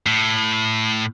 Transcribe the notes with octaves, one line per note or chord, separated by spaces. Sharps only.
A2